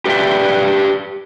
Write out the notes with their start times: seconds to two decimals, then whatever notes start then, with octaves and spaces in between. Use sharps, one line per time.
0.06 G4 B4 D5 E5 G5